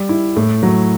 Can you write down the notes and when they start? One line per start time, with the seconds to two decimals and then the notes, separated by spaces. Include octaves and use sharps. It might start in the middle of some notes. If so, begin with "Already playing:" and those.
Already playing: G3
0.09 E4
0.36 A2
0.63 F#3